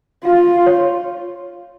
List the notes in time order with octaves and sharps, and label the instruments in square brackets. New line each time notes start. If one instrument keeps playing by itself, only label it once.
[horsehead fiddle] F4 [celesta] F5
[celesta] C#5